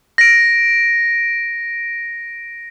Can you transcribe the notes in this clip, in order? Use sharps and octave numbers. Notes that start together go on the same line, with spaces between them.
A#6 D7